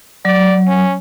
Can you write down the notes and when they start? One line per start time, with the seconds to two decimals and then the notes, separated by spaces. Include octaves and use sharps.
0.25 F#3 D5
0.67 C#4